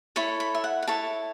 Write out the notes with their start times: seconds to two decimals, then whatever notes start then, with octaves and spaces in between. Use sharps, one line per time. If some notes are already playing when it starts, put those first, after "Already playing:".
0.16 E4 A4 C#5 B5
0.40 B5
0.55 E5
0.64 F#5
0.83 F#5
0.87 E4 A4 C#5 A5